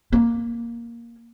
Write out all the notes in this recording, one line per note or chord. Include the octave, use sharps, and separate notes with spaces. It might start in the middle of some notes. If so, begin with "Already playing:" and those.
A#3